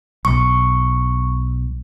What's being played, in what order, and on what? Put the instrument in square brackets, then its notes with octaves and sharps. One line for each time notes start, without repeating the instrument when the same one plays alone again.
[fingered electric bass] B1 [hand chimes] C#6